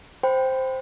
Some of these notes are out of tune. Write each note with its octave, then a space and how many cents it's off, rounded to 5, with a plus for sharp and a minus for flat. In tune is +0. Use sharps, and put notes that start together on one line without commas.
C5 +0 G5 +0 B5 +20